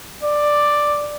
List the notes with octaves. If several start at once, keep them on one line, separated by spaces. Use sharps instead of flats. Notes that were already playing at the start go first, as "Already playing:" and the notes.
D5